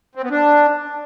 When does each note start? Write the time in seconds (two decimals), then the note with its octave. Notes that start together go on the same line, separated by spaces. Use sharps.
0.15 C4
0.23 B3
0.31 D4